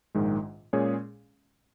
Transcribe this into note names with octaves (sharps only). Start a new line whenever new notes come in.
A#1 G#2 D#3 G#3
A#2 G#3 C#4 G#4 C#5